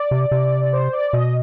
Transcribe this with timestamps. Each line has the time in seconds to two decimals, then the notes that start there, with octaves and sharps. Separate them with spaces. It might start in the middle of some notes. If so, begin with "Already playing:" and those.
Already playing: D5
0.11 C3
0.31 C3
0.73 C5
0.93 D5
1.13 B2 D#5